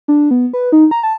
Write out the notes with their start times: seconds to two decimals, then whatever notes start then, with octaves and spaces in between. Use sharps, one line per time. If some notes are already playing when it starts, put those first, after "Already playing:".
0.08 D4
0.31 B3
0.53 B4
0.72 D#4
0.91 A#5
1.03 A5